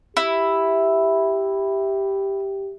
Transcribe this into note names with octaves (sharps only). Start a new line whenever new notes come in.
E4 G4